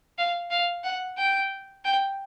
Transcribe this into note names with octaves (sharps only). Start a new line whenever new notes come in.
F5
F5
F#5
G5
G5